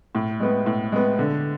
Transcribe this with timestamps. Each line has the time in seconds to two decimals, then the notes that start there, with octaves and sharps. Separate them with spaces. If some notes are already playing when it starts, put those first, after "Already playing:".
0.15 A2
0.40 G#3 B3
0.66 A2
0.92 G#3 B3
1.19 D3